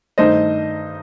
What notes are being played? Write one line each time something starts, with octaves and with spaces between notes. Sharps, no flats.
G2 D#3 A3 D#4 C5 D#5